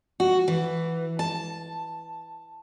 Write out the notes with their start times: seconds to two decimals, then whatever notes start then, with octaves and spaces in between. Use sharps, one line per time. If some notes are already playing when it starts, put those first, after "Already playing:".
0.20 F#4
0.48 E3
1.19 A5